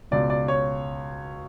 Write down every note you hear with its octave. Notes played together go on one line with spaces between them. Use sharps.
C#2 B2 D5
D5
C#5